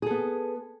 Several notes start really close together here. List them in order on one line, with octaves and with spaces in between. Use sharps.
G#4 A4 B3